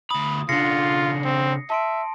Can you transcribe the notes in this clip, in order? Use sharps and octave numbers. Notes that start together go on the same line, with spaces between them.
D2 B5 D#6
C#3 D4 F4 A#6 C7 C#7
C4
E5 A5 C6 D7